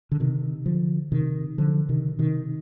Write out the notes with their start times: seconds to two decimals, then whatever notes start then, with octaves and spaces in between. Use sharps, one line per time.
0.12 D3
0.20 C3 D#3
0.66 D3 F3
1.12 C3 D#3
1.58 D3 F3
1.89 C3 D#3
2.19 C3 D#3